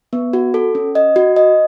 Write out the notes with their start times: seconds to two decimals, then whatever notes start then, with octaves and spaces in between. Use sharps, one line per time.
0.13 B3
0.33 F#4
0.54 A4
0.75 C#4
0.95 D#5
1.16 F#4
1.36 D#5